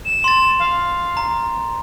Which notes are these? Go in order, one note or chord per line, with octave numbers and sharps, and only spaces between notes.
E7
C6 A6
F5
A#5